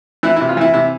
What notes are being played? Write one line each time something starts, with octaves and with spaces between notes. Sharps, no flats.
E3 E4
E4
C3
F4
E3 E4
C3 E4